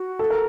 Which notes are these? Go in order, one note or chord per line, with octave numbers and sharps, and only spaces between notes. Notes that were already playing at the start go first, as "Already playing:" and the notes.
Already playing: F#4
A4
A#4